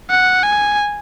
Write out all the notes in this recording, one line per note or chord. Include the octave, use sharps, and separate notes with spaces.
F#5
G#5